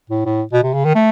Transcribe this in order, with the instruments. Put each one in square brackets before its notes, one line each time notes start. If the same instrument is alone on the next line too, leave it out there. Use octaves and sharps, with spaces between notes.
[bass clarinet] A2
A2
B2
C3
C#3
D#3
A3